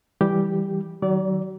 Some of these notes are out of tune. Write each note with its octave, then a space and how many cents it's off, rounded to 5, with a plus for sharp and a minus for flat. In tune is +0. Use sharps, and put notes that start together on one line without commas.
E3 +0 G3 +0 G4 +0
D#3 +0 F#3 +35 D5 -25